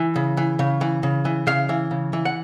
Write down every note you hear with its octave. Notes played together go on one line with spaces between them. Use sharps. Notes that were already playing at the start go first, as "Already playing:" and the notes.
Already playing: E3
C#3
E3
C#3
E3
C#3
E3
C#3 F5
E3
C#3
E3
F#5